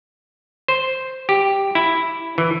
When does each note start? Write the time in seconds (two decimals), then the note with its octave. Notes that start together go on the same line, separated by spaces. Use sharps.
0.68 C5
1.29 G4
1.75 E4
2.38 E3